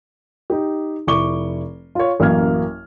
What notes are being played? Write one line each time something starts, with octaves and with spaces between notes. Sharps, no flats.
D#4 G4
F1 E4 C#6 D6 G7
F4 C#5
A1 F#2 A#3 F6 G#6